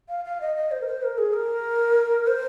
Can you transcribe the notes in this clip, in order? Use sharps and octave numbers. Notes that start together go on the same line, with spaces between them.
F5
F5
D#5
D#5
C5
A#4
C5
A#4
G#4
A#4
C5